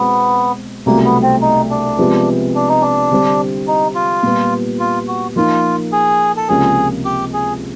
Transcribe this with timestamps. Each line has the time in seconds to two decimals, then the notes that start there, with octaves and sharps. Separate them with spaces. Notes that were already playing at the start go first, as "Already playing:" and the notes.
Already playing: B2 G#3 B3 C4
0.86 C2 B2 F#3 A3 A#3
1.05 B3
1.23 C4
1.42 D#4
1.70 D4
1.99 C3 F3 G#3 B3
2.55 D4
2.69 D#4
2.82 D4
3.11 D3 G3 C4
3.68 D#4
3.95 F4
4.23 A#2 G3 B3
4.79 F4
5.08 F#4
5.36 F3 A#3 D#4 F4
5.92 G#4
6.37 A4
6.49 C#2 C3 F3 A#3 C#4 G#4
7.05 G4
7.33 G#4